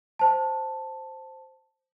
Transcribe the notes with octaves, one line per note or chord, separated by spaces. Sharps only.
C5 A5